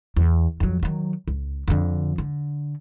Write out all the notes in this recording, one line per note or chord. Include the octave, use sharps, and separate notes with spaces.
E2
F2 F#3
D#3 F#3
C#2
F2 D3
D3